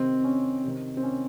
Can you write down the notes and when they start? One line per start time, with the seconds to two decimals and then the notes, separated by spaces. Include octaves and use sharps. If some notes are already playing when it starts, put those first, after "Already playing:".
Already playing: C3 D#3 C4
0.24 C#4
0.64 C3 D#3
0.97 C4
1.03 C#4